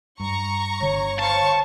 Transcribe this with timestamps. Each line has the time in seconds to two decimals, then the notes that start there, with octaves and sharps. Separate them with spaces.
0.20 G2 A#5 C#6
0.81 G1 D3 C#5
1.19 C5 F5 A5 C#6